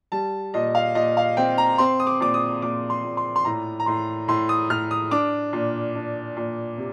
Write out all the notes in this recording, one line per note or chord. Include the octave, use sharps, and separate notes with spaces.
G3 A5
A#2 D#5
F5
A#2 D#5
F5
C4 G5
A#5
C4 C6
D#6
D6
A#2 D6
D#6
A#2 D6
C6
A#2
C6
C6
A2 A#5
A#5
A2 C6
A2 C6
D#6
A2 F6
D#6
D4 D6
A#2
D4
A#2
C3